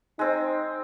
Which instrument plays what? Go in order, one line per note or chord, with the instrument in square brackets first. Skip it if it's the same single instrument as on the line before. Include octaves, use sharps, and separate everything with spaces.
[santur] G#3 C4 [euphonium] D#4